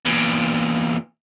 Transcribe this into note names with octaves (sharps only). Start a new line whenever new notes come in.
E2 A#2